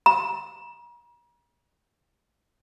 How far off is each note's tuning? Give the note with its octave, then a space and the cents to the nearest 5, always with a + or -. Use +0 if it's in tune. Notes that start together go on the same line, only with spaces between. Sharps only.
A#5 +40